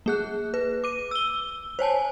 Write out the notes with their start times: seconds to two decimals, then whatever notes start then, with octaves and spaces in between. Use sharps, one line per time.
0.06 A#3 G#4 F#6
0.54 B4
0.84 D6 D#7
1.11 E6 G7
1.79 C5 C#5 G#5 A5